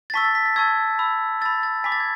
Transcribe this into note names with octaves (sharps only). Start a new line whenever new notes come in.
A6
A5 C#6 E6 B6
A6
B6
A6
A5 C#6 E6 G#6
B5 E6
B5 E6 A6
A6
G#5 B5 D6 B6
A6
G#6